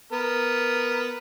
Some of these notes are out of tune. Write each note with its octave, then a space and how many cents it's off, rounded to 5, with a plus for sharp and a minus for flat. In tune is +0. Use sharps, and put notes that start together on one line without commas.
B3 +0 A#4 +0